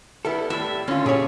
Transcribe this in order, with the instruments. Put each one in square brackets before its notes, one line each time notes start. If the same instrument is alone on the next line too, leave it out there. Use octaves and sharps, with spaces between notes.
[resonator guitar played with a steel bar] G3 B3 E4 [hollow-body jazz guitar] A4
[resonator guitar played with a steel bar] A2 G3 [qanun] E5
[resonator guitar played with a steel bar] D3 F4 [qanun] C#4
[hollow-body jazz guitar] A#2 G4 C#5 [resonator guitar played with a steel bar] G#4